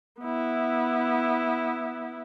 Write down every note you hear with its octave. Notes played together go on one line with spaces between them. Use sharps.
B3 E4